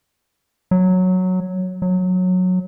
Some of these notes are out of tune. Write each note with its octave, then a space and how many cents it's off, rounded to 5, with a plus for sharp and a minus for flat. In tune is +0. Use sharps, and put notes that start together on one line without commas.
F#3 -5
F#3 -15